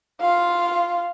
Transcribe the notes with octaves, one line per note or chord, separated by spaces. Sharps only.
F4 F5